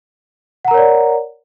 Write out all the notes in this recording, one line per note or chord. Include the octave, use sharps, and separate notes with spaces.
A#4 C#5 D5 F#5 A#5